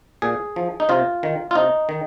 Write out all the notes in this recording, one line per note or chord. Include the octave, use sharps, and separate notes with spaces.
A#2 G#4
F3
D#4
C3 F4
D#3
F4
C3 D#4
D#3